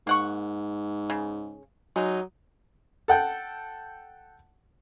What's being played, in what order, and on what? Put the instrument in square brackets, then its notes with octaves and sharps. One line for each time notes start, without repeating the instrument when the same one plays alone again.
[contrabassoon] G#2 [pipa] A#3 F#5 C#6
[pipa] C#3
[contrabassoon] F#3 [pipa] G#3 D#4
[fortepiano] A4 F#5 G5